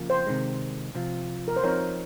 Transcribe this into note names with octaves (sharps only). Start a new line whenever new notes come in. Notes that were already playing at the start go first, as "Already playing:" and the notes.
Already playing: C#3 F3 A#3 F4
C5
C3 D#3 G#3
C3 F3 C4 F4
A#4
C5
F3 C4 D#4 A#4 C#5